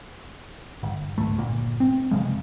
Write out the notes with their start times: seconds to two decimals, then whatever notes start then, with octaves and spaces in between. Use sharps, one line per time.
0.83 G1
1.18 G#1 C#2 A3
1.38 G1 A#2
1.80 C4
2.11 F#1 C3 F3 G#3